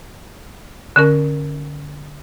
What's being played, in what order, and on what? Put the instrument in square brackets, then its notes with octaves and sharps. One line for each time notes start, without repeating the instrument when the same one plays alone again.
[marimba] D3 C#4 A#4